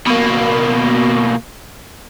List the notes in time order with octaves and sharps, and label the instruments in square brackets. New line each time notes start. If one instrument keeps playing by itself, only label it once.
[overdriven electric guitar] B2 A#3